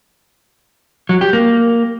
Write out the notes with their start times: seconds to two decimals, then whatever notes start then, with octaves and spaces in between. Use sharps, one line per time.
1.09 F#3
1.21 G4
1.33 A#3